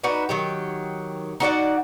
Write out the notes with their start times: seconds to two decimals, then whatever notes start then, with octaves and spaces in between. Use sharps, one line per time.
0.03 D4 D#4 F#4 B4
0.29 D#3 F#3 G4
1.40 D#4 F#4 D5 F#5